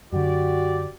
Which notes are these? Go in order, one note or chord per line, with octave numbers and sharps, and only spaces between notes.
F#2 D3 F#4 G4 D5